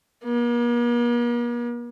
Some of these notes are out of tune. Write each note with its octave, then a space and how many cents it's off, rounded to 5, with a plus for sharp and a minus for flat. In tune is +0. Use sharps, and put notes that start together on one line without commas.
A#3 +45